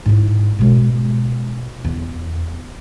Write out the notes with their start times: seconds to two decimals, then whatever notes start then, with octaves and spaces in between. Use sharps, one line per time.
0.06 G#2 E4
0.59 B2 G#3
1.85 E2